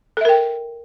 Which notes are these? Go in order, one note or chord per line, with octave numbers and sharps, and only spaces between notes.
A4 A#4 E5 G5